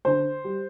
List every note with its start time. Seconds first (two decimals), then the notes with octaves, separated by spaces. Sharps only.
0.05 D3 C5
0.44 G3